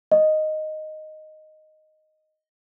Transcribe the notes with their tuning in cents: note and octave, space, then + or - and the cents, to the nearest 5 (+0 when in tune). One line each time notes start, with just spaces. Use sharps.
D#5 -5